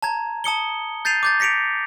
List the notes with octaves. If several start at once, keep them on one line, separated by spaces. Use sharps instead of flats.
A5 A#5 G#6
A5 D#6 C#7 G7
G6 A6 C7 D#7 F7
D6 G6 A6
A#6 B6 C#7 D7 F7